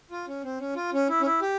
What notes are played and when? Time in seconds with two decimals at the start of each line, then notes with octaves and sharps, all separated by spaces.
0.11 F4
0.28 C#4
0.44 C4
0.60 C#4
0.76 F4
0.93 C#4
1.09 E4
1.21 C#4
1.26 E4
1.42 G4